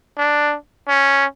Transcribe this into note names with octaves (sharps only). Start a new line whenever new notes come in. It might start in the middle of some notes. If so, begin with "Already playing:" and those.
D4
C#4